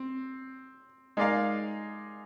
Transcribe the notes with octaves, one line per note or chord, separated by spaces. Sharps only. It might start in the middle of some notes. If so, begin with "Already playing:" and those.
Already playing: C4
G#3 D#4 A#4 D5 F5